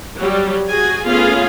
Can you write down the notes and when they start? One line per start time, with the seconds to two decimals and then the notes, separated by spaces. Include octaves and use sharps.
0.18 F#3 G3
0.69 F#4 G#4 G#5
1.05 A3 B3 C#4 F4 G#4 F5